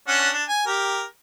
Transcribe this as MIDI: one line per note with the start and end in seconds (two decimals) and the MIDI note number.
0.08 0.30 61
0.08 0.30 62
0.08 0.30 78
0.33 0.44 62
0.49 0.65 80
0.66 1.04 67
0.66 1.04 70